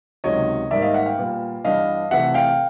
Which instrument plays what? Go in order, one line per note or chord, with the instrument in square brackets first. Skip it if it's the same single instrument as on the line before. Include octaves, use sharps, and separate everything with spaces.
[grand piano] C#2 C3 D#3 F#3 C#5 D#5
G#2 D#3 G3 A#3 D5 E5
D#5 F5
E5 F#5
F5 G5
A#2 G3 B3
G2 E3 G3 B3 D4 D#5 F5
C3 E3 A3 E5 F#5
F5 G5